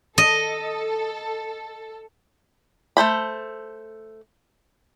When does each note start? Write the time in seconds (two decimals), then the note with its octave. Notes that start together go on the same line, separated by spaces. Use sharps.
0.18 A4 D#5
2.97 A3 A4 C5 B5